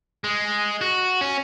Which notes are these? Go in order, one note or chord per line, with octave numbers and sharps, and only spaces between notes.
G#3
F#4
C#4